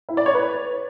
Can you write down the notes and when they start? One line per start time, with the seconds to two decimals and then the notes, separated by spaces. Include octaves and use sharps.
0.09 E4
0.17 D5
0.26 C#5
0.35 B4